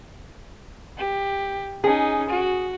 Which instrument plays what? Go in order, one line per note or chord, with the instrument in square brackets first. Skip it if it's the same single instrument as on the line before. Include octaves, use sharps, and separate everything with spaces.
[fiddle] G4
[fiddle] C#4 D#4 [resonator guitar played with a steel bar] G#4
[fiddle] F#4